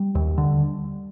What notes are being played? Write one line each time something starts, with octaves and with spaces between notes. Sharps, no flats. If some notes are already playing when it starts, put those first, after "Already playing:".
Already playing: G3
D#2
D3